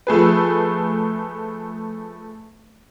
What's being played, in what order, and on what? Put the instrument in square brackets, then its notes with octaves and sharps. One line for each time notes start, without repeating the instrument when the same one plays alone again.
[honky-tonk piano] F3 A3 G#4 B4